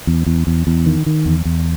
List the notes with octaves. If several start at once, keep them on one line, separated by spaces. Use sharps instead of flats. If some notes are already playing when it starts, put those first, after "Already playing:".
E2
E2
E2
E2
D#3
D#3
E2
E2